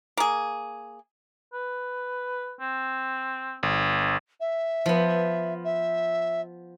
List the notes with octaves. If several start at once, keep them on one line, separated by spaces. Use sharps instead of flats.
A#3 G#4
B4
C4
G1
E5
F3 B3
E5